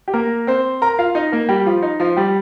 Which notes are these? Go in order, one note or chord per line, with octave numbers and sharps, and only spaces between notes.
G4
A#3 A#4
C4 C5
A#4 A#5
F4 F5
D#4 D#5
A#3 A#4
G3 G4
F3 F4
D#4
F3 F4
G3 G4